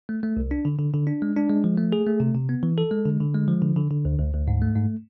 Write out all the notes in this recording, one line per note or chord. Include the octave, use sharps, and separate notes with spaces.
A3
A3
C2
D4
D3
D3
D3
D4
G#3
D4
G#3
F3
A3
G#4
A3
C3
C3
B3
E3
A4
G#3
D3
D3
G#3
F3
D3
D3
D3
D2
D2
D2
G#2
A3
G#2